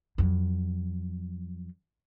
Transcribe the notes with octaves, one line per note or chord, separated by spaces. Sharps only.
F2 F#3